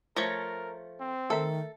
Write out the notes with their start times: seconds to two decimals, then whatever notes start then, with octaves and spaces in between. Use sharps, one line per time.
0.16 F3 A3 A#4 C#5 A#6
1.00 C4
1.30 D#3 A3 A4 A#4 E5